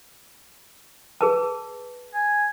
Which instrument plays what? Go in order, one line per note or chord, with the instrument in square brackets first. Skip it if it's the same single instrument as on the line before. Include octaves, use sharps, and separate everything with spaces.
[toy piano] G#4 B4 A5
[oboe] G#5